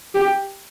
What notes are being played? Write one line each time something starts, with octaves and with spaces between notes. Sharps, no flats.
G4